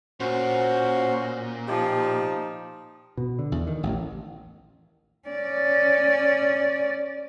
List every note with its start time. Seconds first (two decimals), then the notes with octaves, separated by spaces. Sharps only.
0.20 A#2 C#4 F#4 C5
1.68 F3 D#4 G4
3.17 B2
3.39 D3
3.52 E2
3.67 D#3
3.83 A1
5.29 C#4 D5